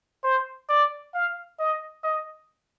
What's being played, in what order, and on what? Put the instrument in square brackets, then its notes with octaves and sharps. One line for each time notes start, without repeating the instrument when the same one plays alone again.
[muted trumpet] C5
D5
F5
D#5
D#5